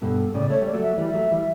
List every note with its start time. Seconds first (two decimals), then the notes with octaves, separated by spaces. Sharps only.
0.02 G2 B2 A4
0.34 A2 C#3 D5
0.50 A3 C#5
0.62 G3 D5
0.74 F#3 A3
0.82 E5
0.96 E3 G3 D5
1.08 E5
1.14 F#3 A3
1.31 E3 G3